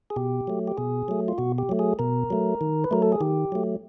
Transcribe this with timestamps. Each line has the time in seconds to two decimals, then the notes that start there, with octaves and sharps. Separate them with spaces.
0.10 G#4
0.16 B2 G4
0.47 F#3 A3
0.68 G4
0.78 B2 G#4
1.08 F#3 A3
1.28 F4
1.38 B2 F#4
1.58 G4
1.69 F#3 A3
1.79 G#4
1.99 B2 A#4
2.30 F#3 A3
2.61 D#3
2.84 B4
2.91 F#3 A3 A#4
3.02 A4
3.12 G#4
3.20 D#3 G4
3.52 F#3 A3